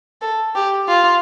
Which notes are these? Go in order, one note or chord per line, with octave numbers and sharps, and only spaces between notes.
A4
G4
F4